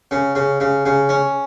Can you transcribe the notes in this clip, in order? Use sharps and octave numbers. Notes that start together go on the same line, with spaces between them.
C#3
C#3
C#3
C#3
C#4